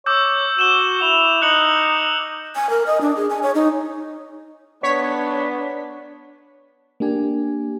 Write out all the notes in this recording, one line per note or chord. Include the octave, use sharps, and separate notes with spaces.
C#5 D6 E6 G6
F#4 E7 G7
E4 F7
D#4 F#6 C#7 F#7
G#5
A#4
D#5
D4
G#4
G#5
C#5
D#4
B3 D4 C#5 B6
A#3 D4 G4 G#5